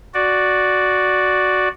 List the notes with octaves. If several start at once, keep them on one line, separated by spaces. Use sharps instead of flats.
F#4 D5